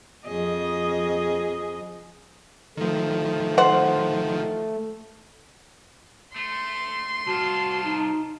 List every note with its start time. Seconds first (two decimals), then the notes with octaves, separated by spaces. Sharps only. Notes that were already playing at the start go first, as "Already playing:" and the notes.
0.25 F2 G#4 D#5
2.77 D#3 F3 A3
3.58 C5 F#5
6.36 A3 C6
7.26 C2 F4 F#4 A5
7.85 D#4